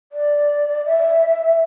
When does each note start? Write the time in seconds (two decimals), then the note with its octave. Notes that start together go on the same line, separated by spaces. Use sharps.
0.12 D5
0.86 E5